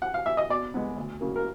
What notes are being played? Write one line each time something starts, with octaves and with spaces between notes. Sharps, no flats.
F#5
F5
E5
D#5
B2 D5
G#3 B3
D2
C#3 F#3 A#3
A#4